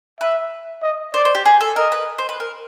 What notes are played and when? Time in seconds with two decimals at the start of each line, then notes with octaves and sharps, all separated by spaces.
0.21 B4 E5
0.82 D#5
1.14 C5 D5
1.25 C5
1.35 G4
1.45 G#4
1.61 A4
1.76 A#4 D#5
1.92 B4
2.18 C5
2.29 B4
2.40 A#4